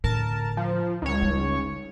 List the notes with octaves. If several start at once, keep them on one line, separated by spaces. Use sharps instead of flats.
A2 D3 A#4 A5
F3
C#2 C#5
G3 D#4